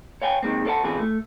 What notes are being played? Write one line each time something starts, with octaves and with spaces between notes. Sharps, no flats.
C#5 F5 G5 G#5
C3 D#3 F3 G#3 A#3 C4
A4 C5 D5 F5 F#5 A5
B2 D3 E3 C4 F4 G#4
A3